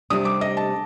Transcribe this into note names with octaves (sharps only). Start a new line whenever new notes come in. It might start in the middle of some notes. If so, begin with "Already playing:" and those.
C3 G3 D4 D#6
D6
D#5
A5